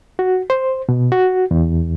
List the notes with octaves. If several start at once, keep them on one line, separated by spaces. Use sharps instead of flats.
F#4
C5
B2
F#4
E2